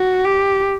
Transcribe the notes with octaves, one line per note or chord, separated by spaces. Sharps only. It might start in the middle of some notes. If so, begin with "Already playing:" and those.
Already playing: F#4
G4